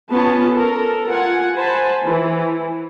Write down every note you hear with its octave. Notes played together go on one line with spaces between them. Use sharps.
B3 C#4 F4 A5
A4 A#4
F4 F#5 G#5
C5 G#5 A5 B5
E3